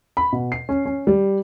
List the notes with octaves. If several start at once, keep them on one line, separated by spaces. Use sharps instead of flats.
B5
B2
C7
C#4
C#4
G3